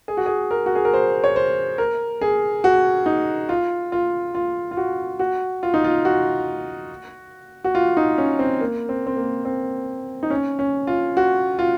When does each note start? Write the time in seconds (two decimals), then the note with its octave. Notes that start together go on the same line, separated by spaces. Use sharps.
0.08 G#4
0.17 F#4
0.26 G#4
0.51 A#4
0.66 F#4
0.75 G#4
0.85 A#4
0.93 C5
1.24 C#5
1.36 C5
1.78 A#4
2.21 G#4
2.64 F#4
3.06 D#4
3.49 F4
3.92 F4
4.35 F4
4.71 F4
4.77 F#4
5.19 F#4
5.63 F4
5.74 D#4
5.84 F4
6.05 F#4
7.64 F#4
7.75 F4
7.97 D#4
8.18 C#4
8.39 C4
8.61 A#3
8.89 C4
9.07 C4
9.17 A#3
9.45 C4
10.23 D#4
10.30 C#4
10.59 C#4
10.87 F4
11.17 F#4
11.59 F4